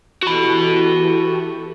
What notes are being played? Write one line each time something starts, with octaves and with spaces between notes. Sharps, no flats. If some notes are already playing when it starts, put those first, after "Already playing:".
E3 F#4 G4 A4 B5